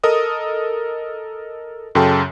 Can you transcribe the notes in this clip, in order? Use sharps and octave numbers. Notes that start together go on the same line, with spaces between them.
A4 A#4 D#5 D#6
F#2 C#3 A4 G5 A5 C6